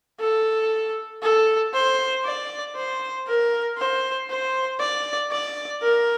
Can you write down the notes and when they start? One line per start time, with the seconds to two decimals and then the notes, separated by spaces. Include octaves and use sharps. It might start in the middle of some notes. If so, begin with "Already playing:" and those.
0.20 A4
1.22 A4
1.74 C5
2.25 D5
2.76 C5
3.27 A#4
3.78 C5
4.29 C5
4.80 D5
5.31 D5
5.82 A#4